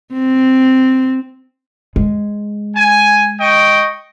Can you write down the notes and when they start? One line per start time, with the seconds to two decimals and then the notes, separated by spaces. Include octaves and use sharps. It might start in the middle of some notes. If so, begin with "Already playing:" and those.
0.14 C4
1.96 G#3
2.76 G#5
3.40 D#5 G5 C#6